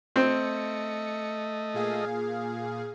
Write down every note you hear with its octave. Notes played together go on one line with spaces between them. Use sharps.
A3 C4 D#5 C#7
A#2 G#4 F5